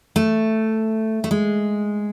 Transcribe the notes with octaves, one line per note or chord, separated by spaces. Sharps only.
A3
A3
G#3